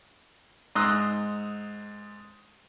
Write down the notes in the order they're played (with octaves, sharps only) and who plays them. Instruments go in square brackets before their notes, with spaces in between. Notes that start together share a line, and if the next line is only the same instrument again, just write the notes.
[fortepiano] G#2 A#5 C6 D#6 E6 F#6